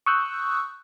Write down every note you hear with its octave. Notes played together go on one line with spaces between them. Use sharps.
C#6 D#6 E6 F#6 G6